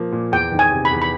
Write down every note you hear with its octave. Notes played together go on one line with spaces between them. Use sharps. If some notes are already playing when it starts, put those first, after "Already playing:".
Already playing: A#2 F3 A#3
A#2
E2 G5
D#3
G#5
C3
B5
E2
B5